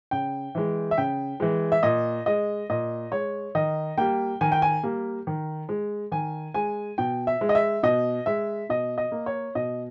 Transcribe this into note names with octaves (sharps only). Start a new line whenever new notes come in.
C#3 G5
E3 G#3
E5
C#3 G5
E3 G#3
E5
A#2 D#5
G#3 D#5
A#2 D#5
G#3 C#5
D#3 D#5
G3 A#3 G5
D#3 G#5
G5
G#5
G3 A#3
D#3
G#3
D#3 G#5
G#3 G#5
B2 G5
E5
G#3
D#5
E5
B2 D#5
G#3 E5
B2 D#5
D#5
A#3
C#5
B2 D#5